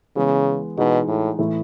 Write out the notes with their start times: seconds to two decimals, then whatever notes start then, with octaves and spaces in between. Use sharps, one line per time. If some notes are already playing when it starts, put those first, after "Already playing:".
0.16 C#3 E3 G#3 B3
0.77 B2 E3 G#3 D#4 F#4
1.08 A2
1.39 A2 E3 A3 E4